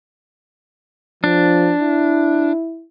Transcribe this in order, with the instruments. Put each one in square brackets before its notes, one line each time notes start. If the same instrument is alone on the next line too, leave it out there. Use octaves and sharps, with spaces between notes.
[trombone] F3 [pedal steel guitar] D4
[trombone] E4